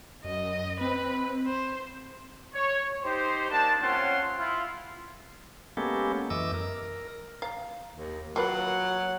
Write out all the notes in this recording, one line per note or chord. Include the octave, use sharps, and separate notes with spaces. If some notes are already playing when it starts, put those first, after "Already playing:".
F#2 D#5
C4 B4
C5
C#5
D#4 G4 C5
A#3 D4 A5
C4 C#4 F4 F#5 C6
E4 F4
G#3 A#3 B3 C#4 G4 A4
F#2 E3 D#5 D6 E6
A#4
F5 A#5
D#2
F#3 A#3 F4 B4 F#5